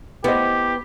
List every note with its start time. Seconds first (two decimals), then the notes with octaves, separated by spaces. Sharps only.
0.24 B3 E4 G4 C5 D#5